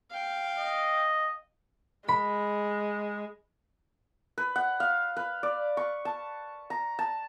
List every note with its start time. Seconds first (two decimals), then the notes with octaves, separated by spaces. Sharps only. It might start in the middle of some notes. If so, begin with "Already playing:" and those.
0.10 F5 G5
0.58 D#5
2.09 G#3 B5
4.38 B4
4.56 F#5
4.80 F5
5.17 B4
5.43 D5
5.77 C#6
6.05 A5
6.70 A#5
6.99 A5